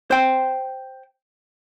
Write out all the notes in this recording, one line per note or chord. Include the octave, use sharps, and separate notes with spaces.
C5 G5